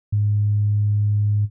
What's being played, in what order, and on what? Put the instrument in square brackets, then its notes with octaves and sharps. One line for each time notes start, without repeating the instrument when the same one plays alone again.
[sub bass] G#2